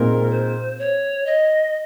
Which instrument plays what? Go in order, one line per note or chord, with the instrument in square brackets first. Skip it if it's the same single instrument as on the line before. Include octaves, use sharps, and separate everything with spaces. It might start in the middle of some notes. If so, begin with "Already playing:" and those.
Already playing: [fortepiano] A#2 G#3 C4 D#4 [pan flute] A#4
[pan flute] C5
C#5
D#5